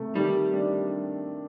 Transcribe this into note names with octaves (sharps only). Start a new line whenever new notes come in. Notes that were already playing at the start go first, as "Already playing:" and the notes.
Already playing: C3 A3
D#3 G3
D4